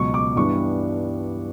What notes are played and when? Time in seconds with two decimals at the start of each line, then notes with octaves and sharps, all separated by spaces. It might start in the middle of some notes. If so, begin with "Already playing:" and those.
Already playing: C#2 B2 F#3 C#6
0.14 D6
0.36 G2 E3 G3 B3 D4 C#6